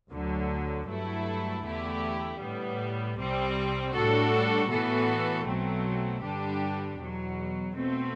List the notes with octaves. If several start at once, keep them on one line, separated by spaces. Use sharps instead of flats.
D2 D3 F#3
G2 F#3 A3 E4 A4
E2 D3 A3 E4 G4
A2 G3 B3
C2 C3 G3 C4
A2 G3 D4 F#4 A4
A2 E3 B3 F#4 A4
B1 B2 F#3 A3 C4
G2 D3 G3 D4 G4
E2 B2 F#3
B2 A3 C4